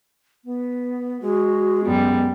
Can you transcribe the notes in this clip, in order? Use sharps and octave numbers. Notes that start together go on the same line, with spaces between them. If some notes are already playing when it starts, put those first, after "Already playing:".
B3
G#3 F#4
F#2 G3 B3